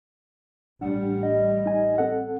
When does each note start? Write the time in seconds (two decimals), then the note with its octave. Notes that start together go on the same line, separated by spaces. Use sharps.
0.81 A1 G3 D4 F#5
1.23 D#5
1.66 D#4 G#5
1.98 C4 A4 F#5